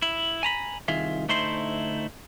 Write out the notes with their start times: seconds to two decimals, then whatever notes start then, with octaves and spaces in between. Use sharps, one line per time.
0.02 E4
0.43 G#5 A#5 B5
0.88 C2 D#3 F4 G#4 E5
1.29 D2 A3 D#4 E4 C5 C6